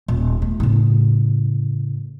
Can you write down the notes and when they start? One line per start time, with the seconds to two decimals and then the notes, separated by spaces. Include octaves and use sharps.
0.08 D#1
0.42 A3
0.60 A2 C#3